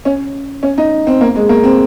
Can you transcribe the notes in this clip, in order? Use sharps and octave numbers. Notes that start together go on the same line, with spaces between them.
C#4
C#4
D#4
C4
A#3
G#3
A#3
C4